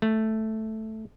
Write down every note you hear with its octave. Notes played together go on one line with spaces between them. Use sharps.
A3